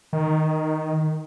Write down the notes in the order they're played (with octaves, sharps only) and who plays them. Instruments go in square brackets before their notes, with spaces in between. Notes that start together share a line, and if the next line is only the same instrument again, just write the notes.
[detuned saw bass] D#3